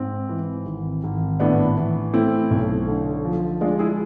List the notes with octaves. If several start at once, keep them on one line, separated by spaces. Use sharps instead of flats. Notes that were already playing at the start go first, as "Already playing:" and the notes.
Already playing: G#2 C4
E3
G#1
G#1
A2 B3 D4
E3
A3 C4 E4
B1
D3
F3
G#3 D4 F4
E4 G#4